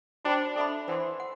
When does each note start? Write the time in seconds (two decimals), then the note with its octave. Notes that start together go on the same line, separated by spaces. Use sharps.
0.25 D4 F#4 C5 G5 B5
0.56 D4 A4 E5 B5
0.88 E3 C5 F#5 C6
1.20 F#5